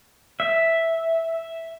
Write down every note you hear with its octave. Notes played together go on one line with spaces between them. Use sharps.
E5